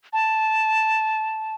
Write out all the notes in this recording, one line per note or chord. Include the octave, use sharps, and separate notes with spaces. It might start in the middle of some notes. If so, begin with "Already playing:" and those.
A5